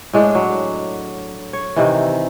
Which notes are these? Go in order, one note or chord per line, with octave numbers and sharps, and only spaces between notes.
A2 G#3 D4
F#3
C#5
C3 D#3 E3